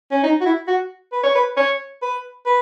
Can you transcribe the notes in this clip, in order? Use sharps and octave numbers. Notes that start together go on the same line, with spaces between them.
C#4
D#4
F#4
E4
F#4
B4
C#5
B4
C#5
B4
B4